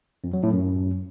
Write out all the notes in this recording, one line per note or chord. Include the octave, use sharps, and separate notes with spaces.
F2
F#3
A2
F#2